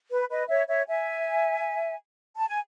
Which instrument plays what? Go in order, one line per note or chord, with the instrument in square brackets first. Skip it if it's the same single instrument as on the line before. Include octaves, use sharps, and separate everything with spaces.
[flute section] B4
B4 D#5
C#5 E5
C#5 E5
E5 G#5
A5
G#5